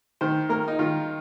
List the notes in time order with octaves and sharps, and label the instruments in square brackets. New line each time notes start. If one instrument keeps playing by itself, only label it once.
[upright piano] D#3 [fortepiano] C5
[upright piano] A#3 [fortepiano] A#4
[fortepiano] D#4
[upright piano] D#3 [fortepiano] F4